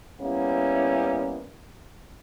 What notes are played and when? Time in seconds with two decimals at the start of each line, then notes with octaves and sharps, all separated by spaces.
0.20 G3 A#3 B3 C#4 E4